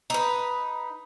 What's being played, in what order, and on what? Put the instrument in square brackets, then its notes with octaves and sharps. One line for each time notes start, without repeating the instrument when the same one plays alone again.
[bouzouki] D#4 B4